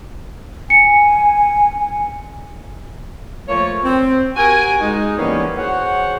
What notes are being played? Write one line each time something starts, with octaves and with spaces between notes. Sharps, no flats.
G#5 C#7
F3 A3 A#3 C#5
C4
F#4 G4 A#4 G#5
G#3 D#4
D#3 E3 G3 A#3 B3 C#4
F#4 G#4 C5 C#5 F#5